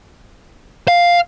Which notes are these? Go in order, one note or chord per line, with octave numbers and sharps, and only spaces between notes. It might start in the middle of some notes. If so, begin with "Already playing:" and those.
F5